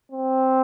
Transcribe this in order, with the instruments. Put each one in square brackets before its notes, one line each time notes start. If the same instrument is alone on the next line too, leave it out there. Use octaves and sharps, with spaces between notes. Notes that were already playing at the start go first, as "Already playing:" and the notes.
[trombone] C4